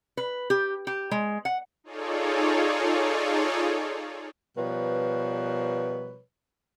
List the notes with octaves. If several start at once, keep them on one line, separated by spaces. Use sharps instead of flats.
B4
G4
G4
G#3
F#5
D#4 F4 G#4 A4 C#5 D5
B2 F3 G3 A#4 B4 C#5